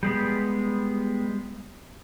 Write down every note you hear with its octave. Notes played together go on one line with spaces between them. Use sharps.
G3 G#3 B3